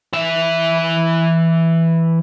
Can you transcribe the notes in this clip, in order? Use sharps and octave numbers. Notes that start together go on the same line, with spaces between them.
E3 E5